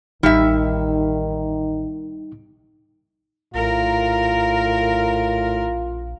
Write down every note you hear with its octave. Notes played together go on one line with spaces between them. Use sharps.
A1 D#3 G3 D#4 E5
A#1 A2 F4 A#4